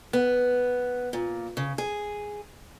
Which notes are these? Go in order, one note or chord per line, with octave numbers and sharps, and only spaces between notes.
B3
A#2
C#3
G#4